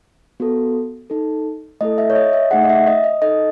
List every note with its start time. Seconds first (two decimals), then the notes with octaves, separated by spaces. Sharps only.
0.40 B3 F#4 A4
1.10 D#4 A4
1.81 A3 E4 A4 D#5
1.98 E5
2.10 C#5
2.15 D#5
2.33 E5
2.51 A3 D#4 G#4 F#5
2.63 D#5
2.69 E5
2.87 D#5
3.04 D#5
3.22 D#4 A4 D#5